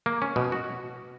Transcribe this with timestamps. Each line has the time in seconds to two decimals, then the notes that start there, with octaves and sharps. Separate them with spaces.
0.06 A#3
0.22 C#4
0.36 B2
0.52 F#4